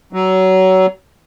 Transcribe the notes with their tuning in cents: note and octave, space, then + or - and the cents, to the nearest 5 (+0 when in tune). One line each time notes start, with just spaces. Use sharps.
F#3 +25